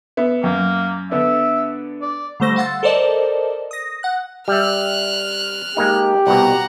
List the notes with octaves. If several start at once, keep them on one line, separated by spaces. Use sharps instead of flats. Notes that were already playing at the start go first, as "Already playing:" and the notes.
B3 E5
F#2 A#3
D3 B3 D4 E5
D5
D3 G3 A3 C5 A#6
F5 F#5 C6 E6 A6
A4 A#4 C5 D5 D#5 A5
D#6 A#6
F#5 F#6
G3 E5 F6 F#6
G#3 A#3 D#4 G4
C2 B2 F#5 A#5